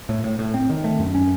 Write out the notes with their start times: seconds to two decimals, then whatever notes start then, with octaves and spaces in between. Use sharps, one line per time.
0.09 A2
0.24 A2
0.39 A2
0.54 C4
0.70 D#3
0.84 A3
0.99 F#2
1.15 C#4